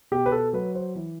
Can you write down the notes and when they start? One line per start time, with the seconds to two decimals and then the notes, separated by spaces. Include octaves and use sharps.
0.11 B2 G4
0.26 B4
0.32 A4
0.53 F#3 B4
0.75 C5
0.95 E3